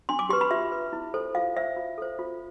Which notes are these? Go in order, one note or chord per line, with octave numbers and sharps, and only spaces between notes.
D4 C6
D6
G4 B4 C6
B5
F4 E5
B4
E4
A4 C5
F4 F5
C5 E5
F4
A4 C5
F4